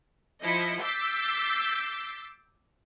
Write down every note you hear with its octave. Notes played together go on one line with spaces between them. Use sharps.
F3 E4 D#5 C#7
D6 E6 G6 A6 B6 C7